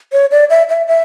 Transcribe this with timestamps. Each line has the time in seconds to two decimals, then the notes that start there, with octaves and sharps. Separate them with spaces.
0.12 C#5
0.31 D5
0.50 E5
0.69 E5
0.88 E5